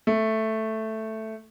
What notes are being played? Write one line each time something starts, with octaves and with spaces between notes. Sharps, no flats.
A3